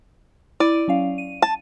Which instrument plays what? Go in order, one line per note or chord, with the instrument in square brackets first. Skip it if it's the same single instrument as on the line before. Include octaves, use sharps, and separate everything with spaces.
[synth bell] E4 D7 D#7 [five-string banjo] D5
[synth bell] F#3 C#4 F5
D#7
[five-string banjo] A5